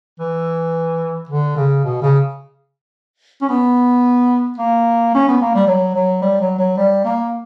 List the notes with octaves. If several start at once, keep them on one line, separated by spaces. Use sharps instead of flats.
E3
D3
C#3
B2
C#3
C#4
B3
A#3
C#4
B3
A#3
G3
F#3
F#3
G3
F#3
F#3
G3
A#3